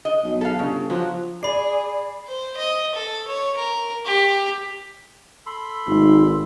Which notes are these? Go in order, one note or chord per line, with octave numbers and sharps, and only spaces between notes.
D#5
B1
A4 E5 F5
G1 C#3
F3 F#3
G#4 D5 B5 C7
C5
D#5
A4
C#5
A#4
G4
A4 B5 C6
G#1 D#4